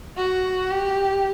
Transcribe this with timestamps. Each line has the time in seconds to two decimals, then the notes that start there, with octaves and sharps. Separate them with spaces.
0.17 F#4
0.71 G4